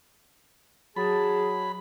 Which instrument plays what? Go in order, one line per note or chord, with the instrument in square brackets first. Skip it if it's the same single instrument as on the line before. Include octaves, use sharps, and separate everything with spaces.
[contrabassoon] F#3 [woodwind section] G#4 A5 [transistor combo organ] B5